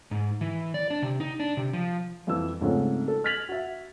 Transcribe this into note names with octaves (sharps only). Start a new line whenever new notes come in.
G#2
E3
D5
D4
C3
D#4
D4
C3
F3
F2 E3 F4 E6
G#2 C#3 F3 A3 C4
A4
F6 G#6 A6 B6 F7 F#7
F#4 E5